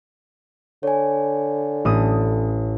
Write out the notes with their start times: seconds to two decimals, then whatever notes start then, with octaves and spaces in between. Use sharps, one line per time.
0.83 D3 C#5 G#5
1.85 A1 D#6